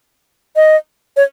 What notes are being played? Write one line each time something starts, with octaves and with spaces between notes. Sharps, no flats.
D#5
C#5